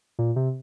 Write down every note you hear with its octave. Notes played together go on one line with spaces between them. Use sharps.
A#2
C3